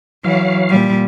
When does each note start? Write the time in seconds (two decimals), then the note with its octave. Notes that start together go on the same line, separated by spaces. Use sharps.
0.24 E3 F#3 F5
0.69 A#2 G3